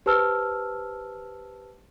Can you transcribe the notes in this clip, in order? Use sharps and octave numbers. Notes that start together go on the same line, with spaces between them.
G4 B4 C5 A5 E6 F6